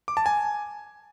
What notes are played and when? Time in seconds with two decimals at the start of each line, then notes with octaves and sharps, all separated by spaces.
0.08 D6
0.17 A5
0.26 G#5